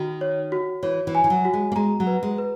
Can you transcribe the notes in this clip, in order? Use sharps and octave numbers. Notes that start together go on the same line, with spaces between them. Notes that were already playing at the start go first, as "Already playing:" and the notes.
Already playing: D#3 F#4
C#5
F#4
E3 C#5
E3
G#5
E3
F#3
F#4
G#3
A#3
G#3 A#5
F#3
B4
G#3
B4